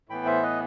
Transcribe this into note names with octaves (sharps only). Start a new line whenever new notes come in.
A2 E3 B3 G5 B5
C5 E5
B4 D#5